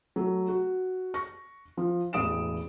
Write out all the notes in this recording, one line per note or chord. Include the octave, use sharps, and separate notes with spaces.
F#3 A3
F#4
C#6 A#6
F3
E1 A1 D#6 D7 E7